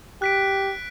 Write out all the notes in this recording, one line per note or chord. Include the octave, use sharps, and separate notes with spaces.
G4 F#6 B6 D7